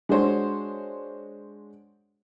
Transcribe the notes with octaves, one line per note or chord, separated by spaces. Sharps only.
G#3 D4 F#4 C5 C#5